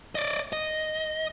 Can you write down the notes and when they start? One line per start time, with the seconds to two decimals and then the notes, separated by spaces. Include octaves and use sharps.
0.15 D5 D#5
0.53 D#5